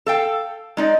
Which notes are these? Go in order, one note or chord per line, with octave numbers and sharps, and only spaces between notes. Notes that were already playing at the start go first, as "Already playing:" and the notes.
A4 F5 G5
G#3 D#4 D5